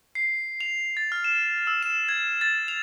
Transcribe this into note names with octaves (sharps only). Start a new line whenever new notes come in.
C7
F7
A6
F6
E7
E6
E7
G#6
A6
F7